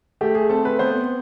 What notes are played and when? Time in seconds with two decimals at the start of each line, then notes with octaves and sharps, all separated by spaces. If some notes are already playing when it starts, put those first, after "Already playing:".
0.21 A3 G4
0.35 G#4
0.50 C4 A4
0.65 B4
0.79 B3 C5